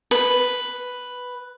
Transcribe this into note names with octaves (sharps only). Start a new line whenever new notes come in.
B4